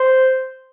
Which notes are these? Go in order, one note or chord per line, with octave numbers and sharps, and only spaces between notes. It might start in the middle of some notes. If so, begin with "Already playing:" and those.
Already playing: C5